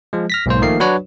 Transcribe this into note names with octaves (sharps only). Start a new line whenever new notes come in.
F3 G#3
F6 A#6 B6
B1 G#2 A#3 C5
D#3 F3 A3 A#3 C7
F#3 D4 F#4 B4 C#5